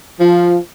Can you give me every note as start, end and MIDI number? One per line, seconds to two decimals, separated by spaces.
0.20 0.59 53